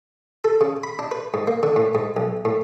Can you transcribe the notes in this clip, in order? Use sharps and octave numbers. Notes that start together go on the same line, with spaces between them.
A4
C#3
B5
D4
B4
G#2
A#3
D3
A2
G#2
B1
A2